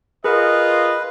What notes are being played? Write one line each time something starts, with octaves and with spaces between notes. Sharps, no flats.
F4 G#4 A#4 B4 D#5